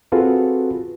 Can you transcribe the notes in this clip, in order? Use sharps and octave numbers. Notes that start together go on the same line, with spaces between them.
C4 F4 F#4 G#4 A4 B4